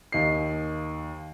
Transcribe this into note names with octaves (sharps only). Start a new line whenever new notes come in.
D#2 D#5 C7